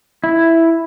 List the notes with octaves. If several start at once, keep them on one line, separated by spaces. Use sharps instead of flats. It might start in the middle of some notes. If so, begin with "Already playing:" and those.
E4